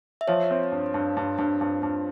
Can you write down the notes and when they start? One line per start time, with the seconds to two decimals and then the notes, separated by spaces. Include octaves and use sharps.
0.21 E5
0.28 F3 C#5
0.51 C4
0.72 G2
0.94 G2
1.17 G2
1.38 G2
1.61 G2
1.83 G2